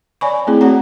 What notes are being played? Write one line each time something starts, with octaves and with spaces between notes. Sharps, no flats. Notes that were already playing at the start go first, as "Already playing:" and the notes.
C#5 D5 G#5 B5 C#6
A3 C4 E4 G#4
A3 F#4 G#4 C#5 F#5 A#5